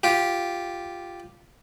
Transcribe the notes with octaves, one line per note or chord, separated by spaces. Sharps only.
F4 G4